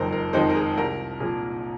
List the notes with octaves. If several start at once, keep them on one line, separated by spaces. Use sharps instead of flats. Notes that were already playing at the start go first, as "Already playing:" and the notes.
Already playing: F#1 F2 D#3 G#3 D#4 A#4 C5
A#4
F2 D#3 G#3 D#4 C5
A#4
G#4
C2 A#4
A#2 F3 G#4